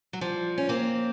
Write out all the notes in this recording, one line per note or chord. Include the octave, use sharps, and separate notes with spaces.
F#3
F3 G3
C#4
A#3 C4